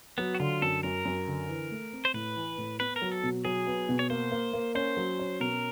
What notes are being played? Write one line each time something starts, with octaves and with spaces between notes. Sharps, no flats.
F#3 B3
F#4
D3 F4
F#2 A4
F#2 A#4
F#2
D3
E3
A3
C4
C5
A2 B4
E3
A2
B3 B4
A#4
F#3
A4
B2
F#3 G#4
B3
B2
C#5
A#3 C5
A#3
A#3
C#4 C5
F#3
C#4
B2 A#4